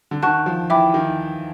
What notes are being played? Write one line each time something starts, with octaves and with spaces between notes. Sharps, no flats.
D3
D#3 F#5 A5 C#6 F#6
F3
E3 E5 G5 B5 D6
D#3